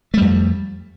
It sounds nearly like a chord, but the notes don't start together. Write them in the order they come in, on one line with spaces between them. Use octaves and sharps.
A3 G3 F2